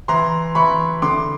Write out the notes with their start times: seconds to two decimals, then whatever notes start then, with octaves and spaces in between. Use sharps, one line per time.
0.08 E3 A#5 C6
0.55 E3 B5 C#6
1.02 D3 C6 D6